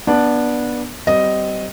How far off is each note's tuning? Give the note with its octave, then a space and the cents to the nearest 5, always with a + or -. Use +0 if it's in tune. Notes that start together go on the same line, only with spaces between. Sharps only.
B3 -20 D4 +0
G3 -20 C4 -20 D#5 +0